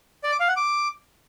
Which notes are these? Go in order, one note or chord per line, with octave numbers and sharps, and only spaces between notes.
D5
D6
F5
F#5
D6